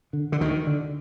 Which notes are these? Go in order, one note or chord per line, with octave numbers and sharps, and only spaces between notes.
D3
D3
D2 D#3
D3